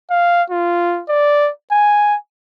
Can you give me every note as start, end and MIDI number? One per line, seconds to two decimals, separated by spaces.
0.10 0.43 77
0.50 1.02 65
1.09 1.51 74
1.72 2.16 80